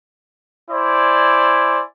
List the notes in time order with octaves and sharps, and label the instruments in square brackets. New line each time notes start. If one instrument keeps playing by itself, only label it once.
[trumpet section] E4 C5 D5 G#5